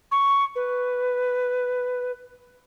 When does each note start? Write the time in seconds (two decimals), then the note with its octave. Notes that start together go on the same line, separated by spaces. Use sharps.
0.11 C#6
0.56 B4